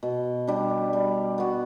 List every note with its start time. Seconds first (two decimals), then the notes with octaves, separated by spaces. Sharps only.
0.03 B2
0.47 G3 D4
0.93 G3
1.38 B3 F#4